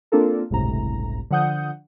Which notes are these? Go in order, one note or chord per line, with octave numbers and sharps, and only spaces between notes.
A#3 C4 D4 F4 A4 A#4
G1 C#2 A2 C3 A#5
D3 F3 F#5 D#6 G6